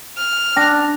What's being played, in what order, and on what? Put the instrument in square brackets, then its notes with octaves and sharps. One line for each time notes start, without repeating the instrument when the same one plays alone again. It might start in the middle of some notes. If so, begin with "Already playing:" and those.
[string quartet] F6
[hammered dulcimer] D4 [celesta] G5 A#6